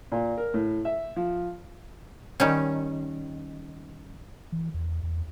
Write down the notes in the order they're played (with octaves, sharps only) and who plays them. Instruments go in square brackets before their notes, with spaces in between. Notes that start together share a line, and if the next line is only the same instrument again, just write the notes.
[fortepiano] A#2
A#4
A2
E5
F3
[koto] D#3 G3 C#4
[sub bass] E3
E2
E2